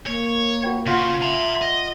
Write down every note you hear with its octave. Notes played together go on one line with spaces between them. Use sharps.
A#3 C#5
F#4 B4 G5
C#3 F4 F#5
E5 A#5 C6
D#5